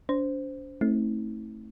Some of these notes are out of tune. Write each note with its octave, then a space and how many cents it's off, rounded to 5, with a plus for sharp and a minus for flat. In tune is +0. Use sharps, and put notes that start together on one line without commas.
D4 -45 C5 -10
A3 +0 C4 +30 E4 -40